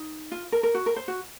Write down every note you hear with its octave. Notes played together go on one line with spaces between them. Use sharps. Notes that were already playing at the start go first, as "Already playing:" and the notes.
Already playing: D#4
F4
A#4
A#4
F#4
A#4
C5
F#4